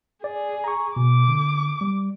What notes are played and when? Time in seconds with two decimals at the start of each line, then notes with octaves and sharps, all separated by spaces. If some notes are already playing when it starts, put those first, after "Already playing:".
0.24 G#4 D5
0.64 A#5 C#6
0.96 B2 D6
1.28 D3
1.81 G3